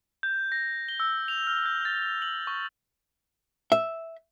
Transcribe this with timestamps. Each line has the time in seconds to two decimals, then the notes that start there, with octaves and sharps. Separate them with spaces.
0.23 G6
0.52 A#6
0.89 G7
1.00 E6
1.28 F7
1.47 F6
1.66 G6
1.85 A6
2.22 F#7
2.47 C#6
3.72 E5